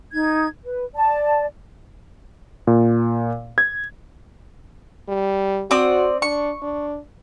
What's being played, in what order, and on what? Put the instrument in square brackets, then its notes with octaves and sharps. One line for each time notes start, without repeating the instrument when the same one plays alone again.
[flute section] D#4 G#6
B4
D5 A5
[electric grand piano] A#2
G#6
[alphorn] G3
[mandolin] C4 D5 D#6 [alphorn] F#4
[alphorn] D4 [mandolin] C#6
[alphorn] D4